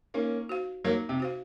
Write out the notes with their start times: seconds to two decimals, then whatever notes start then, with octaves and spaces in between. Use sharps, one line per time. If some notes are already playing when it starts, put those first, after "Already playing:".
0.14 A#3 C#4 D#4
0.49 F#4 C5 F5
0.85 F#3 A#3 D#4
1.09 C3
1.20 F#4 C5 F5